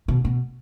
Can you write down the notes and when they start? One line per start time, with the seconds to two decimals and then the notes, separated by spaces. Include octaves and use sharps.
0.08 B2
0.25 B2